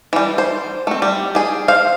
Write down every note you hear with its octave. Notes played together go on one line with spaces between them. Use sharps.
E3 G3
C5
A3 C4
G3
G4 G#4
C5 F5